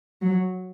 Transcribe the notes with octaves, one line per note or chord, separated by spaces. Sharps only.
F#3